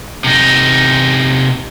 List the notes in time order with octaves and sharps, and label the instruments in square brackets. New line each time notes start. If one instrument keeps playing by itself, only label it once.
[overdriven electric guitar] C3 D#4